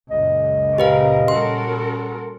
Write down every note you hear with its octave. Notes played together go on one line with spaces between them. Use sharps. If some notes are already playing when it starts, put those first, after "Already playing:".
C#2 F#2 A#2 D#5
C#3 G4 A#4 B4 F5
A#2 G3 C#4 F#4 A4 A#4 C6